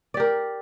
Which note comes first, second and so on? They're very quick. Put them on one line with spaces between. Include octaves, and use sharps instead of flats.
D5 G4 A#4